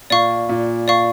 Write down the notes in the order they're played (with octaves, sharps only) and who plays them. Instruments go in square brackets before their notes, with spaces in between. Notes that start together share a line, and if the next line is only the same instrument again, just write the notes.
[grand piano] A#2 [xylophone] D5 F5 C#6
[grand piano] A#2
[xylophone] D5 F5 C#6